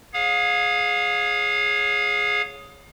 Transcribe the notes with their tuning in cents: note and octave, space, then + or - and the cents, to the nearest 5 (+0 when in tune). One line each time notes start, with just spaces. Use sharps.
G#4 +0 C#5 +0 F5 +35